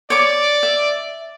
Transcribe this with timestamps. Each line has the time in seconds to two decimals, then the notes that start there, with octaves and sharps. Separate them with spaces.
0.10 C#5 D5 D6
0.63 E5